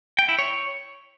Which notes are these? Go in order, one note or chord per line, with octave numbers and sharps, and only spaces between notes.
G5
E4
C#5